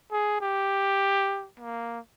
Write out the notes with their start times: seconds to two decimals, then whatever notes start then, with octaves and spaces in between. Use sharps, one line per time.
0.12 G#4
0.41 G4
1.60 A#3